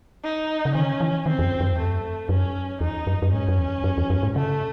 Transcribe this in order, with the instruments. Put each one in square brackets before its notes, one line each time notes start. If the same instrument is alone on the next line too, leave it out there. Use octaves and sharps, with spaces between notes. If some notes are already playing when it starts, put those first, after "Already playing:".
[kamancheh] D#4
[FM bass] C#3
[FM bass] D#3 [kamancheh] C#4
[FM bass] E3
[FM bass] D#3 [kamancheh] C4
[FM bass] E2
F#2
F#2
E2
[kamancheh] A3
[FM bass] F#2
[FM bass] F#2 [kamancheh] C#4
[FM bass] E2 [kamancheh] D#4
[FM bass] F#2
F#2
[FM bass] G#2 [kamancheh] C#4
[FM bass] F#2
E2
F#2
E2
F#2
G#2
[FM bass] C#3 [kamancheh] A3